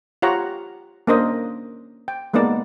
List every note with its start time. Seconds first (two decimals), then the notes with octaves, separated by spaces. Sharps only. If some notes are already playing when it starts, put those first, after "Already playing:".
0.22 F4 G4 C#5 F#5 A#5
1.07 A#3 C#4 D4 A#4 C5 D#5
2.08 G5
2.34 G#3 A#3 B3 D#4 D5